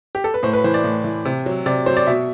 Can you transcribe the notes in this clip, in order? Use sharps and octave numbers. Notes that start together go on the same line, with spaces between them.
G4
A4
B4
A2 C5
B4
E3 C5
D5
A2
E3
C3
F#3
C3 D5
F#3 C5
D5
B2 E5